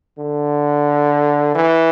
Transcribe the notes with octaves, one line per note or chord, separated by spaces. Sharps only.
D3
E3